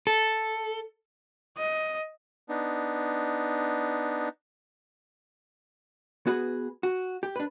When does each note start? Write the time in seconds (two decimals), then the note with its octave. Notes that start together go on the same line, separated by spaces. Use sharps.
0.07 A4
1.58 D#5
2.49 B3 D4 D#4
6.27 B3 F#4 G#4 B4
6.83 F#4
7.23 G4
7.36 D4 B4